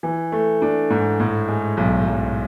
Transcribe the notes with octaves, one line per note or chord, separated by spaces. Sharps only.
E3
A3
D4
G#2
A2
G#3
B1
B1